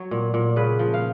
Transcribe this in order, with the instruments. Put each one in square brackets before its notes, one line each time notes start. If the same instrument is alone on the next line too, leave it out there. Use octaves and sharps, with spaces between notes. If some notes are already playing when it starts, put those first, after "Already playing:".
Already playing: [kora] F#3 C#5
A#2
A#2
C#3 B4
F3
F5